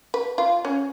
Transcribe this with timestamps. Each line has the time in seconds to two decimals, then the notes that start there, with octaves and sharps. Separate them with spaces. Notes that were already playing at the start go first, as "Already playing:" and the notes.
0.14 B4
0.38 F4
0.65 C#4